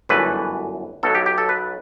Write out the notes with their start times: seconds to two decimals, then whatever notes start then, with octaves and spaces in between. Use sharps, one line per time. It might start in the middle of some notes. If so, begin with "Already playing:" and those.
0.09 G1 F#2 E3 A3 B4
1.03 B1 B2 F#3 A4
1.15 G4
1.26 G4
1.38 A4
1.49 B4